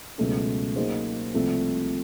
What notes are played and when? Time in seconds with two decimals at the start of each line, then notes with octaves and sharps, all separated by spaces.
0.18 C#2 B2 F#3 A3 C#4
0.76 F#3 A#3 D#4 G#4 C5
1.34 C2 C3 F3 A3 C4